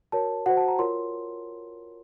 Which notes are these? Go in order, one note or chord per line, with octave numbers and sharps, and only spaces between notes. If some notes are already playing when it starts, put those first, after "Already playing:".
F#4 A#4 C#5 A5
F#4 C5 F#5
A5
A#5
F4 A#4 C#5 C6